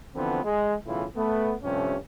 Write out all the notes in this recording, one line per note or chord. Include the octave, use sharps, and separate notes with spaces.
D3 E3 F3 B3 C4
G#3
B1 A2 C#3 E3 E4 F4
A3 B3
G2 C3 F3 A3 C#4